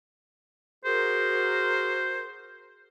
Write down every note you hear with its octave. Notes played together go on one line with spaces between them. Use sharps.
F#4 G#4 A#4 C5